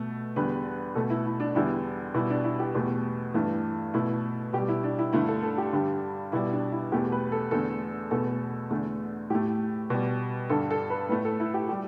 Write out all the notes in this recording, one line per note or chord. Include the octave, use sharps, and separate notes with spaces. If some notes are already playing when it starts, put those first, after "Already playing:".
Already playing: B2 A3
E2 D3 G3 B4
B2 A3 A4
E4
E4
D4
E2 D3 G3 E4
B2 G3 E4
D4
E4
G4
E2 B2 A3
G2 E3 A3
B2 A3 E4
B2 G3 G4
E4
D4
E4
G2 D3 A3 E4
A4
A4
G4
G2 D3 G3
B2 G3 E4
D4
E4
E2 B2 A3 G4
B4
A4
E2 D3 A3 A4
E2 B2 A3 A4
E2 D3 A3
A2 A3 G4
B2 G3
G2 D3 G3 A4
A4
B4
A2 A3 B4
A4
E4
G4
G3 G4